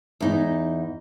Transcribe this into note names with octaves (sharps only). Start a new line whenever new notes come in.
E2 D#4